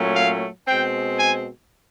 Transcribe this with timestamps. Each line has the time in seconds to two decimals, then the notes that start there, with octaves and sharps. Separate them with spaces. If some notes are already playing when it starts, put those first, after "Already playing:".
Already playing: A#2 F#3 A3 C#4
0.16 F5
0.66 B2 G#3 C4 G5
1.18 G#5